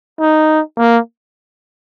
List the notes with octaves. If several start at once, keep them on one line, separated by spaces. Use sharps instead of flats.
D#4
A#3